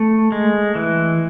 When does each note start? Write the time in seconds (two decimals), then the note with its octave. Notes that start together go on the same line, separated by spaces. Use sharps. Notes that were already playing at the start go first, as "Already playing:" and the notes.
Already playing: A3
0.32 G#3
0.75 E3